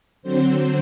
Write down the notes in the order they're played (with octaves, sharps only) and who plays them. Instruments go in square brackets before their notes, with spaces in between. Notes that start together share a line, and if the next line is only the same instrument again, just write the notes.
[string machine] D3 F#3 C4 C5